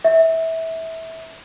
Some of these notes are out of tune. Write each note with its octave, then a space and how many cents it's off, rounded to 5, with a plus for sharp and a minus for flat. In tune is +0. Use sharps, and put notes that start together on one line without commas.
E5 -20